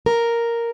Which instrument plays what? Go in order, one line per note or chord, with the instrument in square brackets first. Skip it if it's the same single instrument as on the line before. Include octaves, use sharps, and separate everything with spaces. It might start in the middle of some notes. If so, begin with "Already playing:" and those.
[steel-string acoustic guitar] A#4